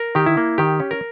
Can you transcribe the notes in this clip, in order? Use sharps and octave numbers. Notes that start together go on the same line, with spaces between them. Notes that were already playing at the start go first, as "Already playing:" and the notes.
Already playing: A#4
D#3 G4
E4
A#3
D#3 G4
C#4
A#4